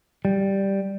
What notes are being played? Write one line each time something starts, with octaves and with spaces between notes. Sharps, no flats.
G3